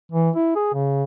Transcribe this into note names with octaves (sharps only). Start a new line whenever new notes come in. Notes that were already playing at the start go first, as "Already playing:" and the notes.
E3
E4
G#4
C#3